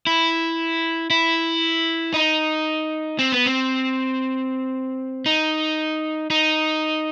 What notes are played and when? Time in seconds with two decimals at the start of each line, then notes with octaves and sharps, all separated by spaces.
0.07 E4
1.10 E4
2.14 D#4
3.19 C4
3.32 B3
3.46 C4
5.26 D#4
6.30 D#4